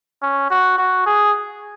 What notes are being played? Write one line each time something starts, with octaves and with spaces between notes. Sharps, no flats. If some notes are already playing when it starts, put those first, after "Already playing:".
C#4
F#4
F#4
G#4